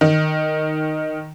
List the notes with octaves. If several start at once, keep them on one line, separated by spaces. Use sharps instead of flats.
D#3